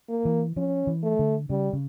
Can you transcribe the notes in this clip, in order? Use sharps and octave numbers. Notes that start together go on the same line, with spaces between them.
A#3
E3
F3 C#4
E3
A3
D3
C#3 G3
C#3